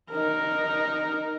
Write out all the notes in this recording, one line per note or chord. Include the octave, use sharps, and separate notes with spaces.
D#4 A#4